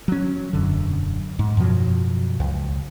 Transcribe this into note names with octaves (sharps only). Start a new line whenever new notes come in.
F#3 C#4
E1 F#2 D3
G#2
F#2 B2 F3 F#3
C#2